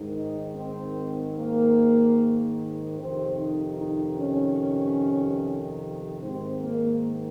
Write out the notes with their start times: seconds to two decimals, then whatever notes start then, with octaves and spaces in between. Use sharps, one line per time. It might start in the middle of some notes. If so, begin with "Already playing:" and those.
Already playing: G#2 D#3
0.15 D#4
0.55 C4
1.37 A#3
2.98 F2 C3 D#3 C4
3.38 D#4
3.78 D#4
4.19 C#4
6.20 G#2 D#3 C4
6.62 A#3